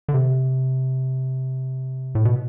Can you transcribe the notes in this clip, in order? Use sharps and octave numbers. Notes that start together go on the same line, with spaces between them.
D3
C3
A2
B2